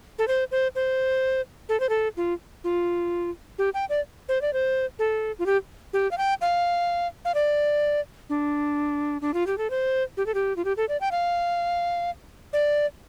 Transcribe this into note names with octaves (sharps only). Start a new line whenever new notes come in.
A4
C5
C5
C5
A4
C5
A4
F4
F4
G4
G5
D5
C5
D5
C5
A4
F4
G4
G4
F5
G5
F5
F5
D5
D4
D4
F4
G4
A4
C5
G4
A4
G4
F4
G4
A4
D5
G5
F5
D5